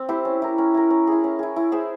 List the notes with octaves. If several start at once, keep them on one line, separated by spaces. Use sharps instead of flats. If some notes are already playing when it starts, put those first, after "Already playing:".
Already playing: C4
E4 G4 C5
C#4
E4 A#4
C#4
E4 A#4
C#4
E4 G#4
C#4
E4 G#4
E4
G#4 C5 E5